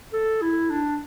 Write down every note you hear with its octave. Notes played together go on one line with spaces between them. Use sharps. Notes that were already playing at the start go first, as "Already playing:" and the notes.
A4
E4
D4